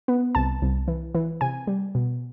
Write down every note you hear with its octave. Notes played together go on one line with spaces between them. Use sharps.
B3
C2 A5
C2
E3
E3
C3 G#5
G3
B2